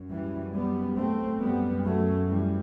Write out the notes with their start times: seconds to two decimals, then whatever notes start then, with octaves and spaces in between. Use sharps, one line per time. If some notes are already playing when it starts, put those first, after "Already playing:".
Already playing: F#2
0.10 E3 G3
0.54 G3 B3
0.97 A3 C4
1.41 F#2 G3 B3
1.85 F#3 A3
2.28 E3 G3